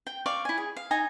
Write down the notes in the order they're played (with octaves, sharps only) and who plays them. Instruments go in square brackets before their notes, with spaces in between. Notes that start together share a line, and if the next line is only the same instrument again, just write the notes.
[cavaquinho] G5
D5 F5 C#6
E4 G#5
G#4
F5
D#4 D#5 G#5 A#5